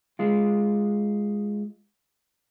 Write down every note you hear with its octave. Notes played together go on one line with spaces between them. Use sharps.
G#3 F4